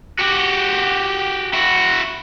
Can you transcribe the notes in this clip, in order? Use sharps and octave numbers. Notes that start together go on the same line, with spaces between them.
F#4 G4
E4 F#4